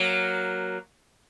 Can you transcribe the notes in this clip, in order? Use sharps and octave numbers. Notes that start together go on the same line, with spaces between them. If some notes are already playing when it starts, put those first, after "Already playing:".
Already playing: F#3 A#3